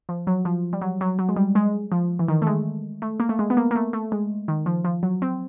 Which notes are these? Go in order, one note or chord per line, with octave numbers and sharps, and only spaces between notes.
F3
F#3
F3
G3
F#3
F#3
F#3
G#3
G3
G#3
F3
E3
D#3
A3
G#3
A3
A#3
A3
G#3
B3
A#3
A#3
A3
A3
G#3
D#3
F3
F3
F#3
C4